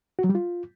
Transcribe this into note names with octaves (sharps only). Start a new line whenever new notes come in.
F#4
F#3
G3
F4